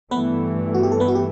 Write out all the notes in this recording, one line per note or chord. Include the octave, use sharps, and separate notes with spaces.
G2 E3 A3 B3 B4
F#4
G4
A4
B3 B4
F#4
G4